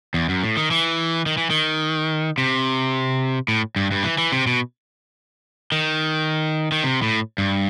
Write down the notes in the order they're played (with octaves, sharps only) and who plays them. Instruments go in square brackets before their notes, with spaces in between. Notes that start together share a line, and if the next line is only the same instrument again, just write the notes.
[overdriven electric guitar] E2
F#2
A2
D#3
E3
D#3
E3
D#3
C3
A2
G2
G2
E3
E3
C3
B2
D#3
D#3
C3
A2
G2